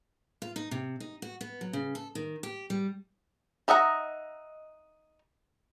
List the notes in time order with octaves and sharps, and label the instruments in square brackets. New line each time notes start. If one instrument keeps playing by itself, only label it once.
[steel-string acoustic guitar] F4
D#4
C3
D#4
F#4
B3
F#3
C#3
A4
D#3
G4
G3
[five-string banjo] D#4 D#5 E5 F#5 A#5